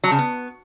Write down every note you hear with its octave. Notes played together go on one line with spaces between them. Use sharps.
F#3
C#3
B3